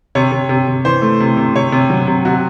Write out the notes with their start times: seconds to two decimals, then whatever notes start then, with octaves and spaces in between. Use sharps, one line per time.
0.15 C3 C#5
0.32 C3
0.49 C3
0.68 C3
0.85 E3 C5
1.02 A3
1.20 C3
1.37 C3
1.56 C3 C#5
1.72 C3
1.90 F#3
2.07 C3
2.25 C3 F#4